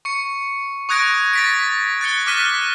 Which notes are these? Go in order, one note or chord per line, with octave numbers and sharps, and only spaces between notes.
C#6 C#7
C#6 D#6 F#6 G#6 A#6 D7
A6 B6 D7
F#6 A6 C#7 G7
D6 F6 F#6 B6 D#7